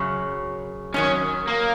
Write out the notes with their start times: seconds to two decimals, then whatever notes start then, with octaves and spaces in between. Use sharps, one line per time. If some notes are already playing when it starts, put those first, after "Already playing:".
Already playing: F#2 C#3 F#3
0.94 F#2 D#3 F#3 C#4
1.48 A#3